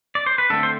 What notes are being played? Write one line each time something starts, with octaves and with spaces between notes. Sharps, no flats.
D5
C5
B4
D3 A3 C4 A4
C5